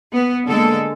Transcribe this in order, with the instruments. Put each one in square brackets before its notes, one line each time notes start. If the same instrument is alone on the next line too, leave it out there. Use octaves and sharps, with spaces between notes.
[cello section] B3
D3 G#3 A#3 A4